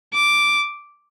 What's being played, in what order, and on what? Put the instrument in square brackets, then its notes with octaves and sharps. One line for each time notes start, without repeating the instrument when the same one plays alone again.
[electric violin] D6